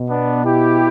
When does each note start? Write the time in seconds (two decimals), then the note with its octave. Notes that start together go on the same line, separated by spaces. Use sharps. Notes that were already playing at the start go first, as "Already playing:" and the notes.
Already playing: B2
0.08 B3 D4
0.43 E4 G4